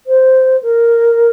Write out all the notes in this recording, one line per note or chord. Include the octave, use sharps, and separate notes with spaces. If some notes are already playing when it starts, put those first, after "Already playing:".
C5
A#4